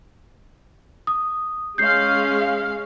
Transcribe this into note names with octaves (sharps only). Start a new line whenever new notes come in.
D#6
G#3 C#4 F5 G6 C7